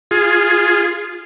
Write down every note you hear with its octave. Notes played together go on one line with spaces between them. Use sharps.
F4 G#4